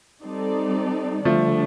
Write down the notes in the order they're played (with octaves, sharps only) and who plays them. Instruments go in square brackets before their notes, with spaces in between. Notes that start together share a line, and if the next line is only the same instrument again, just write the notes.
[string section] G3 C4 D#4 A4 D5
[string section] D3 G3 D4 [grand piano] F3 A3